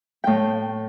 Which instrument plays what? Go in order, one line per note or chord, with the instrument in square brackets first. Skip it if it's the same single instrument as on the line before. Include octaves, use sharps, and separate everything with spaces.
[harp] A2 G5